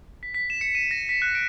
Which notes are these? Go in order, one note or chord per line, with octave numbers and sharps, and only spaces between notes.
B6
B6
E7
C#7
D#7
A#6
B6
F#6
D7